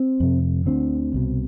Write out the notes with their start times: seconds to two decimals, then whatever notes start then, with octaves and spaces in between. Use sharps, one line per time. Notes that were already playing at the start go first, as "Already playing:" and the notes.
Already playing: C4
0.20 F2 C3
0.66 D2 D3 C4
1.14 C2 B2